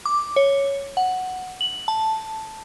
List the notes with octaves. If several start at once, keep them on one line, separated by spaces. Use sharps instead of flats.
D6
C#5
F#5
F#7
A5